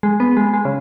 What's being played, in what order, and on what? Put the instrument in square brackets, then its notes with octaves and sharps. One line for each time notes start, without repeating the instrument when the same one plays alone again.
[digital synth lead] G#3
B3
G#3
G#3
C#3